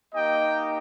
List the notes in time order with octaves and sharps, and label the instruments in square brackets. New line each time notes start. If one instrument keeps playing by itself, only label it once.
[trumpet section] A#3 D#4 G4 D#5 G5